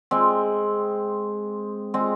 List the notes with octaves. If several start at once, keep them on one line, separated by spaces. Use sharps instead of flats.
G#3 C4
G#3 C4